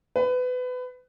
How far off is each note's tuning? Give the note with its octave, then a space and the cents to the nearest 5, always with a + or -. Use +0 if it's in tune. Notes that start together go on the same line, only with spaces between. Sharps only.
B4 +25